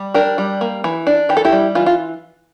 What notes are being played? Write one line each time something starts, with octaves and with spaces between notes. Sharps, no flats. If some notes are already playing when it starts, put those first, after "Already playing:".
Already playing: G3
D4 G4 A#4
G3
A#3
E3
D4
E3 G4
A4
E4 G4
G3
E3 F4
F4